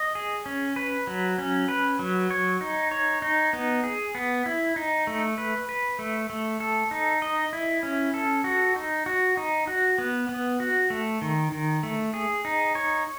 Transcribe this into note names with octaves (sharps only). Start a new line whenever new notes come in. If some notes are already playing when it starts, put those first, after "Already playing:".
Already playing: D#5
G#4
C#4
B4
F#3
C#4
B4
F#3
C#5
D#4
C#5
D#4
B3
G#4
B3
E4
D#4
A3
B4
B4
A3
A3
A4
D#4
D#5
E4
C#4
A4
F#4
D#4
F#4
D#4
F#4
B3
B3
F#4
A3
D#3
D#3
A3
G#4
D#4
C#5